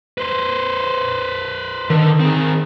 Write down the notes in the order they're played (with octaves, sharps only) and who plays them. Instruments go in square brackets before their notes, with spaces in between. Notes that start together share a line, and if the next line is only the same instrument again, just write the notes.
[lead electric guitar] B4 C5
[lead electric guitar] D3 [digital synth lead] D#3
[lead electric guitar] C4 G#4